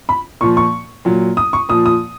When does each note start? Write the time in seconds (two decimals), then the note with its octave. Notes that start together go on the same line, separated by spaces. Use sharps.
0.09 B5
0.41 A#2 F3 C#6
0.57 C#6
1.05 A#2 F#3
1.37 D#6
1.53 C#6
1.69 A#2 F3 D#6
1.86 D#6